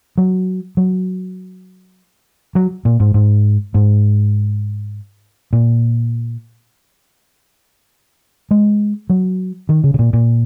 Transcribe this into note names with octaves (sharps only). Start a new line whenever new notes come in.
F#3
F#3
F#3
A#2
G#2
G#2
G#2
A#2
G#3
F#3
D#3
C#3
C#3
A#2
A#2